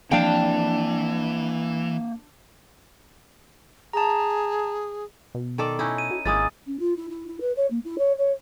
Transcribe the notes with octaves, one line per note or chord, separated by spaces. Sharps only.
E3 F3 A#3 C4 D4 F5 G5
G#4 A5 A#5
B2
D#3 A4 D5
C#4 D#4 E4
D#7
F#4
G#1 G#3 A#3 E4 D#6 A6
C#4
F4
E4
E4
E4
B4
C#5
A#3
E4
C#5
C#5